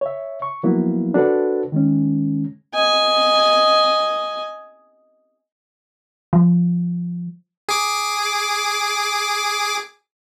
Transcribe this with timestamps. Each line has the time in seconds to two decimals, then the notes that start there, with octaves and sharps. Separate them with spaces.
0.01 C#5 E5
0.42 C#6
0.63 F3 F#3 A#3 B3 E4
1.14 D4 F#4 A4 B4 C5
1.72 D#3 G#3 C#4
2.74 D#5 G#5
6.33 F3
7.69 G#4 D6